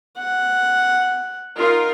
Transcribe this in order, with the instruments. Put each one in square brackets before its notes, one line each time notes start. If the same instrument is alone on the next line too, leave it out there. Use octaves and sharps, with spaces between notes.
[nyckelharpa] F#5
[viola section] D#4 F4 A#4